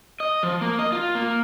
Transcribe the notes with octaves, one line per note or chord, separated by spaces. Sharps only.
D#5
F3
A#3
D#5
F4
A#3